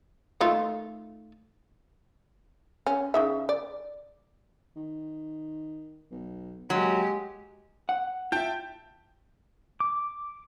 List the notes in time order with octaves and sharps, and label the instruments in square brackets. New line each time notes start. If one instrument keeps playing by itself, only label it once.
[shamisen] D#3 A3 F4
C#4
C#3 D#4 E5
D5
[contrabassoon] D#3
B1
[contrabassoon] A#1 [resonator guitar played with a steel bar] F#3 [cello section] G#3 G4
[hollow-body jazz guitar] F#5
[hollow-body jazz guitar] F4 E5 [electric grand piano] G5 A5 G6
[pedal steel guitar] D6